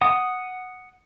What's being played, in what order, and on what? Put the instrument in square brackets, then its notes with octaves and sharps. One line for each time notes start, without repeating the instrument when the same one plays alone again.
[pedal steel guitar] F#5 D#6